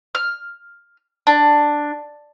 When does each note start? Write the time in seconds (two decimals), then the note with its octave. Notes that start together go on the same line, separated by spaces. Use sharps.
0.15 F6
1.27 D4